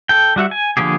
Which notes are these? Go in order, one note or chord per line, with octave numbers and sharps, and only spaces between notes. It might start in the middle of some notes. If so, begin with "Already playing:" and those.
A4 G5
G3 F#4 E5 F#5
G#5
D3 F3 A#3 G4 G#4